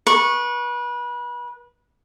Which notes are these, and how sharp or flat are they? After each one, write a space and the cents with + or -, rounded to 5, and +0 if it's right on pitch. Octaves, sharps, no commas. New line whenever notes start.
B4 -30 C#6 -15